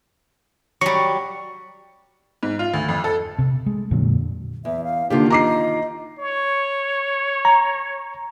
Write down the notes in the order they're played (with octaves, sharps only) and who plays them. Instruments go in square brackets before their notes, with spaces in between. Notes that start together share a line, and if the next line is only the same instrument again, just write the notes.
[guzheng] F#3 G3 [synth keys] C#6
[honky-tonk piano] G#2
F4
D2
F2
A4
[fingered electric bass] C3
G#3
F2 A#2 D3 F#3
[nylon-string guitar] E2 [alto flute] E5
[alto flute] F5
[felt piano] D3 G4 [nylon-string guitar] D#3 A#3 F4 [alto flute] D4
[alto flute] D#5 [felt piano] A#5 D6 C7
[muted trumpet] C#5
[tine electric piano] A#5